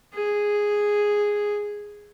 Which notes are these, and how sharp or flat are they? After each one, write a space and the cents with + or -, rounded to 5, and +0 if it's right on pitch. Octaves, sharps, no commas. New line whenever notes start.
G#4 -5